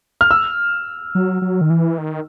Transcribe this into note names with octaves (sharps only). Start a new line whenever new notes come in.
F6
E6
F#3
F#3
D#3
E3
D#3